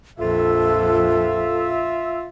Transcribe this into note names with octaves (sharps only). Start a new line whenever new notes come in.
A#1 F2 F4 A4 E5